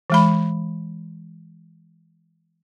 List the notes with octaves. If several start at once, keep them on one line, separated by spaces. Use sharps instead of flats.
E3 G#3 B5